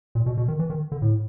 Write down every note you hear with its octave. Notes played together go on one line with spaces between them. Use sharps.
A#2
B2
B2
D#3
E3
D#3
D3
A2